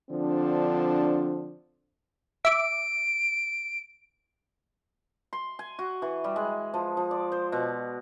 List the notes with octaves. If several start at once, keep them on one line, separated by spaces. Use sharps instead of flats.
D3 F3 C4 D4
E5 D6 D7
C6
G#5
F#4
E3
G3
G#3
F3
F3
D5
C5
B2